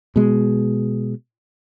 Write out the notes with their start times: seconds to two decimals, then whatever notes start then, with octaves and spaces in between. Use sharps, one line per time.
0.16 B2 G#3